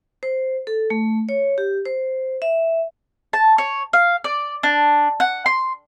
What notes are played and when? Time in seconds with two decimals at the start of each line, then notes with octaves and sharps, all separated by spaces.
0.23 C5
0.67 A4
0.90 A3
1.29 C#5
1.58 G4
1.85 C5
2.42 E5
3.33 A5
3.58 C#5
3.93 F5
4.24 D5
4.63 D4
5.20 F#5
5.46 C6